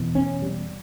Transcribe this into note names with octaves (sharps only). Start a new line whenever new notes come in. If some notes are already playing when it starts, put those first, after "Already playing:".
Already playing: E2 B2
C#4
G3